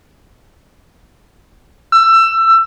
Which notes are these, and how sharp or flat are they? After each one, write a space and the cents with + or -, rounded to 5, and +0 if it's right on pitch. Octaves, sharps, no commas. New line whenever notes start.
E6 +20